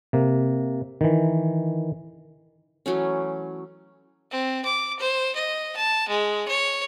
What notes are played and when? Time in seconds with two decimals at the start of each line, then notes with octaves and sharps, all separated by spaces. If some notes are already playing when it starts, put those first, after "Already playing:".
0.13 C3 A#3
1.01 D#3 E3
2.86 E3 F#3 A3 C#4
4.31 C4
4.65 D6
5.00 C5
5.36 D#5
5.77 A5
6.08 G#3
6.48 C#5